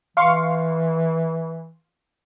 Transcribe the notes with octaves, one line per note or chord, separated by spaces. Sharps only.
E3 F5 C6 C#6